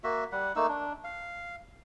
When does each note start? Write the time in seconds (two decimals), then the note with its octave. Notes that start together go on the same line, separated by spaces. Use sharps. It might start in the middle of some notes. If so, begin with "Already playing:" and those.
0.04 A#3 F#4 E5
0.32 G3 F#5
0.56 A3 A#3 D#4 E6
0.69 D4
1.04 F5